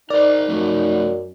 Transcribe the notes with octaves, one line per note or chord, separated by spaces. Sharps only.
D#4 A#4 C5 D5
F#2 F3 A3